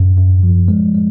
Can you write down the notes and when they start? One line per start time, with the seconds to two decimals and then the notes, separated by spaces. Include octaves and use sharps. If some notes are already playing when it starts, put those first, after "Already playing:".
Already playing: F#2
0.17 F#2
0.43 F3
0.68 G#3
0.94 G#3